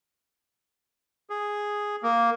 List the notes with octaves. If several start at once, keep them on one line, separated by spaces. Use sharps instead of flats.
G#4
A#3